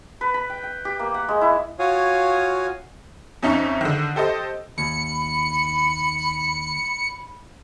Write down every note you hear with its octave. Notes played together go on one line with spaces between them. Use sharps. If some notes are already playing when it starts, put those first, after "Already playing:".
B4
B5
G5
G5
G4
A#3
F#5
G#3
E4
F4 F#4 C#5 F5 G#5 D#6
F2 C#4 D#4 E5 C#6
D3 D#3
G4 A4 C5 D#5 D#6
D#2 B5 C#7